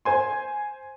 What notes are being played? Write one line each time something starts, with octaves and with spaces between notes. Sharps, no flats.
C5 G#5 C6